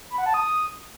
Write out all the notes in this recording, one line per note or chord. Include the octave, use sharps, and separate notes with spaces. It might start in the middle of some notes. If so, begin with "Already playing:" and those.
B5
F#5
A5
D#6